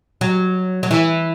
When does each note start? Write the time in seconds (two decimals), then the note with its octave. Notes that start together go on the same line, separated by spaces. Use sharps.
0.21 F#3
0.83 F#3
0.91 E3